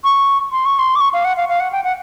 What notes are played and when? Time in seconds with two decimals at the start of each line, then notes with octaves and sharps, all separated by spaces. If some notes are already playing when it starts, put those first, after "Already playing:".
0.04 C#6
0.52 C6
0.66 C#6
0.79 C6
0.96 D6
1.01 C#6
1.14 F5
1.25 F#5
1.37 F5
1.49 F5
1.60 F#5
1.72 G5
1.84 F#5